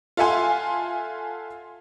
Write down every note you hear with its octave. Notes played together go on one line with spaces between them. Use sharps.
F4 A4 E5 F#5 G#5 C6